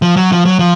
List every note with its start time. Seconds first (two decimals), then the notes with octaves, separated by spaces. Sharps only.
0.02 F3
0.17 F#3
0.32 F3
0.45 F#3
0.59 F3